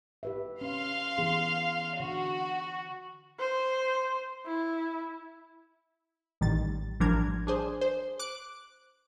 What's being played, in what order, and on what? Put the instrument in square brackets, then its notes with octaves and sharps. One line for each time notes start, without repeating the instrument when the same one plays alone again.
[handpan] G4 B4 E5
[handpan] C#4 [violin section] F5 C6
[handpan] E3 B3 G#4
[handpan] D3 [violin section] F#4
[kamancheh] C5
E4
[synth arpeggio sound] A1 D#3 G3 A6
A1 F3 G3 D4 A#4 G#6
D4 G#4 C5
C5
D6 F#6 D7